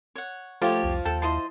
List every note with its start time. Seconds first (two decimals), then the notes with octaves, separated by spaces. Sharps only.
0.15 C#5 F#5
0.62 F3 A3 F4 G4 C#5
0.83 C2 F2
1.05 D#2 A4 G5 A5
1.22 E4 C5 D#5 A5 C6